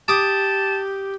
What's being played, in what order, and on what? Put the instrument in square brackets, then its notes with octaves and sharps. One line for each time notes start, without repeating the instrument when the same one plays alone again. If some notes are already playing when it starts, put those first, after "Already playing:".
[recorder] G4 [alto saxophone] A5 [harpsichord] D6 D#6